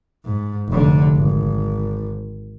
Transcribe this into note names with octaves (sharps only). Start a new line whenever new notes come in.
G#2
F1 D3
G#1